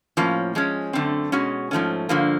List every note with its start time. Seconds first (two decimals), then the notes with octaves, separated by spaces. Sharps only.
0.17 A2 F3 A#3 C#4
0.55 F3 G#3 C#4
0.93 F#2 D3 F3 A3 C4
1.32 B2 G#3 C#4 F#4
1.71 G#2 F3 A3 C#4
2.09 G2 D3 F3 A#3